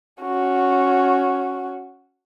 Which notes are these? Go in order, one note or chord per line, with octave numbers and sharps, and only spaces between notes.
C#4 F#4